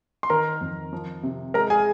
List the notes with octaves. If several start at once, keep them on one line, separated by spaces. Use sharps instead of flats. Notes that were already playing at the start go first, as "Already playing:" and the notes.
C6
D#3 A#4 A#5
F2
F3
C3
G#3 A#4 A#5
G#4 G#5